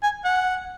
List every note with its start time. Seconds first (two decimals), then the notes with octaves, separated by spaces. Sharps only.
0.03 G#5
0.24 F#5